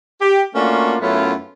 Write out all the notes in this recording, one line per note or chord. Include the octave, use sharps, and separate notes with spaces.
G4
A3 A#3 C#4 D4 F4 F#4
F#2 A3 B3 C#4 E4 F4